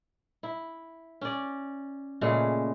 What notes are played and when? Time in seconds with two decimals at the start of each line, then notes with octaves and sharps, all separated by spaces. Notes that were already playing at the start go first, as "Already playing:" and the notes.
0.43 E4
1.21 C#4 D5
2.21 A#2 C#3 G#3 A3